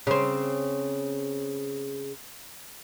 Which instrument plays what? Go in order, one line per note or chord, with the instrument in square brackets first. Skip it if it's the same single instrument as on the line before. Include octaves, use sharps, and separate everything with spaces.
[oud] C#3 C4